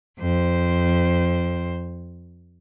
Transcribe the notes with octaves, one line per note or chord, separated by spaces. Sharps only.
F2 C5